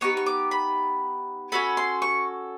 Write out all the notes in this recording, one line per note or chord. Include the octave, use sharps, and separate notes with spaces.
B3 D#4 G4 C#6
C#6
D6
B5
C#4 F#4 A4 B5
C6
C#6